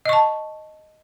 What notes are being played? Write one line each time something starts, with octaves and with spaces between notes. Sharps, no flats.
D#5 A5 C#6